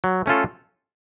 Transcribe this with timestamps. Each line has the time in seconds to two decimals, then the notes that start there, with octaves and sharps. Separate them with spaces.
0.04 F#3
0.26 A3 C#4 F4 A4